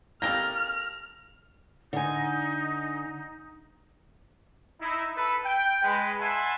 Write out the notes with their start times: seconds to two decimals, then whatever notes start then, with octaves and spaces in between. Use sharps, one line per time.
0.22 A#3 G4 A4 F6 A#6
1.93 D3 D#4 G#5
4.80 D#4 E4
5.16 A4 B4 B5
5.44 G5
5.83 G#3 B4
6.20 E5 F#5 G#5 A5 B5 C6